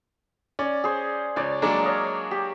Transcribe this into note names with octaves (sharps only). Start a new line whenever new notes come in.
C#4 D5
G#4 C5
C#2 C#5 D5
F#3 G#3 A#3 D4
C#5 D#5 F5
G4